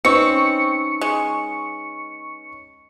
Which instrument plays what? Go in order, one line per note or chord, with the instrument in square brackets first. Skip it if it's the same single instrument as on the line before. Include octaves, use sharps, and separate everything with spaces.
[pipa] C4 [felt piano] C#4 D#4 B4 [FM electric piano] C#6 C#7
[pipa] G#3